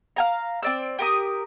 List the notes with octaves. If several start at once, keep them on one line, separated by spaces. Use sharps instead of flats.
F5 G#5 A#5
C4 D5 E6
G4 A#4 D#6